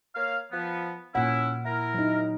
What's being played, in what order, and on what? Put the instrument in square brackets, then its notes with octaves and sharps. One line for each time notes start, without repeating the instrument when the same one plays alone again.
[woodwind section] A#3 C#5 F5
F3 B3
[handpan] A#2 F#5 [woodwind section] C#4 E4
[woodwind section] E4 A#4
[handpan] F#3 D#4